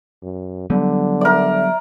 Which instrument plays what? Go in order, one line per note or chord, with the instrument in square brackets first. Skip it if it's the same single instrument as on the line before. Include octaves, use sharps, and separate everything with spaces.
[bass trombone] F#2
[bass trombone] D3 [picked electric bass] F#3 G3 B3
[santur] A#4 D5 [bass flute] E5